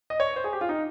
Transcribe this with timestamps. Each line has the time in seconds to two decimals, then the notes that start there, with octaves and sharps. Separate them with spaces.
0.10 D#5
0.20 C#5
0.36 C5
0.44 G#4
0.53 G4
0.61 F4
0.69 D#4